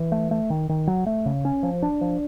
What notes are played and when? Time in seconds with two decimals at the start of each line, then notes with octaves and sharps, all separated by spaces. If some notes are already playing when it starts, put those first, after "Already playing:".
Already playing: E3
0.12 A3
0.31 A3
0.50 D#3
0.69 D#3
0.87 F#3
1.06 A3
1.26 C#3
1.45 C#4
1.63 F3
1.82 D4
2.01 F3